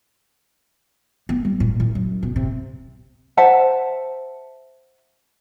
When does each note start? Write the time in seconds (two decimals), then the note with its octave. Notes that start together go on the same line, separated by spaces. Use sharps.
1.29 B3
1.45 G3
1.60 A#2
1.80 F#1
1.95 F#2
2.23 B2
2.36 C3
3.37 C5 E5 F#5 A5